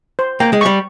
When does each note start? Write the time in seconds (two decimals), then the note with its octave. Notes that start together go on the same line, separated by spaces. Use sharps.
0.19 C5
0.40 A#3 G5
0.53 G#3
0.61 G3 C#6